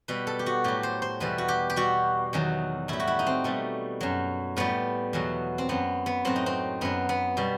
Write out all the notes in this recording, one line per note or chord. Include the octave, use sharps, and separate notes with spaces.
B2 G3 B4
A4
G4
F#4
A2 F#3 G4
C5
C5
E2 B2 G3 B4
F#4
G4
G4
B2 G3 F#4
E2 D#3 F#3
A2 G3 E4
F#4
E4
D#4
C4
B2 G3 A3
F#2 F#3
A2 G3 B3
E2 B2 F#3
C4
F#2 F#3 B3
B3
A2 F#3 C4
D#4
C4
F#2 F#3 B3
B3
B2 G3